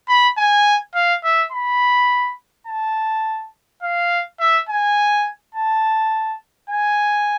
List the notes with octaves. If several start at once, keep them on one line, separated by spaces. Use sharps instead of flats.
B5
G#5
F5
E5
B5
A5
F5
E5
G#5
A5
G#5